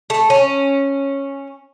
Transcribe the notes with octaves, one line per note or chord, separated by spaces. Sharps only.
A3
C#4